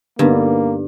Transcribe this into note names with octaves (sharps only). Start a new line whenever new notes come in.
G2 D3 A#3 B3 D#4